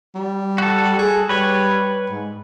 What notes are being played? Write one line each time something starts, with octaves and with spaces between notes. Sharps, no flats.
G3
F#4 A4
G#4
G3 B4 C#5
G#2